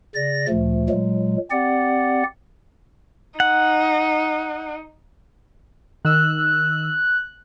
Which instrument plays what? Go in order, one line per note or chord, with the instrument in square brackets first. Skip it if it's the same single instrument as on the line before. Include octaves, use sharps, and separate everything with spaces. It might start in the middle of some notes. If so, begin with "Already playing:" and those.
[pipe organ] C#3 D5 A#6
D2 A#2 F3 A3
A#2 F#3 G#3
C4 G4 D5 F#5
[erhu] D#4 [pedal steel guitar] F#5
[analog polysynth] D#3 E6 [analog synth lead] F#6